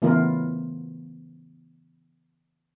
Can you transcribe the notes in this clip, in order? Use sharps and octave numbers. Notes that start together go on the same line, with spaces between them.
C#3 E3 A3 B3 F4 A#4